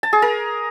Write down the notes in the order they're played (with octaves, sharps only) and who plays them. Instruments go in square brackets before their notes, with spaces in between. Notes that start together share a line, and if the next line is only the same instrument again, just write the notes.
[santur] A5
G#4
A#4